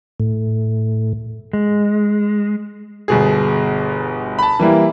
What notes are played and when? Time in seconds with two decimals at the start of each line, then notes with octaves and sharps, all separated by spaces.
0.20 A2
1.53 G#3
3.08 G1 B2 G#4
4.39 A5 B5
4.60 E3 G3 A#3 E4